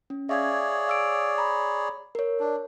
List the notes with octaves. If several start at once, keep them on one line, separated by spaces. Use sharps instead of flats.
C#4
G#4 C#5 D5 E5 F5 G#6
F5 E6 D7
A#5 B5
A#4 C#5
D4